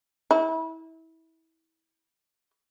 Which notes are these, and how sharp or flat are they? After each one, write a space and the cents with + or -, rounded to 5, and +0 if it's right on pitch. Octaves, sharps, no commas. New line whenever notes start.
E4 -25